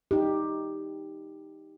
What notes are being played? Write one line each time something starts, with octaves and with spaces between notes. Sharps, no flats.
D#4 G4